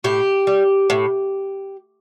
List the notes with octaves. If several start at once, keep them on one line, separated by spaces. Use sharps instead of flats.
A2 G4
G3
A2